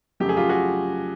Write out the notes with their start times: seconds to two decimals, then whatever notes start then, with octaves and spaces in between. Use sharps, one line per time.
0.20 F2 C#3 F#3 A3 G4
0.29 G#4
0.37 F4 G4
0.49 F#4 G#4